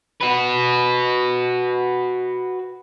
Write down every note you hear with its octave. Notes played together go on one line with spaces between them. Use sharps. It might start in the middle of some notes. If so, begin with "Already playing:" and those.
F#4 B4